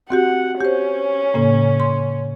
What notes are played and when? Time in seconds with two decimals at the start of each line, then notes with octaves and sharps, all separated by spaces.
0.10 C4 F#4 G4 F#5
0.61 C#4 G4 C5
1.34 A2 C#3 A#3
1.80 C6